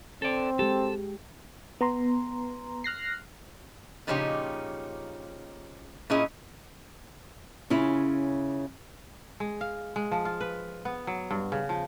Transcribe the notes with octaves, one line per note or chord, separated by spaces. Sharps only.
C4 A4 D5
G#3 G4 A4
B3 A#5 C6
F6 F#6 A#6 C7
A#2 C#3 F3 C#4 D#4 G4
A#2 C#4 E4 G#4 D#5
C#3 C#4 E4 F4
G#3
F5
G#3
F3
F4
B4
B3
F#3
G2
C#3
F3